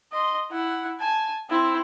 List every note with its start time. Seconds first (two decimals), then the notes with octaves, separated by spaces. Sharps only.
0.12 D#5 C6
0.51 E4 F#5
1.00 G#5 A5
1.50 C4 E4